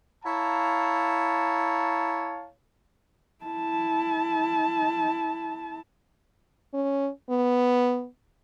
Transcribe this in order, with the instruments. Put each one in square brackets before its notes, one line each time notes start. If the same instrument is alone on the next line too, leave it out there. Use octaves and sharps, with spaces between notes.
[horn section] E4 C#5 F5 A5 A#5
[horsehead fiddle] E4 A5
[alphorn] C#4
B3